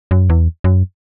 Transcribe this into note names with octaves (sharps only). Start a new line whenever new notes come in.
F#2
E2
F#2